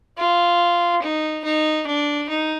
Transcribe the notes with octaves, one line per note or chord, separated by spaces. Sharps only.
F4
D#4
D#4
D4
D#4